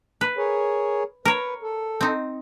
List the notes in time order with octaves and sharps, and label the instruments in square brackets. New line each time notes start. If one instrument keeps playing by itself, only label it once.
[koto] B4
[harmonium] G#4 A#4 C#5
[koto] A#4 C#5 [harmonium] B4
[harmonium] A4
[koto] C4 D#4